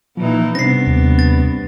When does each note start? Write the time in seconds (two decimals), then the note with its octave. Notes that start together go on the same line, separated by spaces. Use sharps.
0.17 A#2 E3 F3 D#4
0.55 G2 C3 B3 C4 D4 A#6 C7
0.87 D#2
1.19 A6